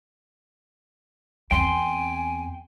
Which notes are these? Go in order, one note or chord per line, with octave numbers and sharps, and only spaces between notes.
E2 C4 G5 G#5 C6